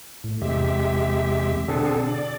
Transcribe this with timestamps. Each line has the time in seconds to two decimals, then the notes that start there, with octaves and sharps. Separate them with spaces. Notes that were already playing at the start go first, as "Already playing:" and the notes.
0.24 A2
0.42 E2 C3 G#3 G4 E5
1.68 B2 D3 C4 D4 G#4 A4
2.07 D5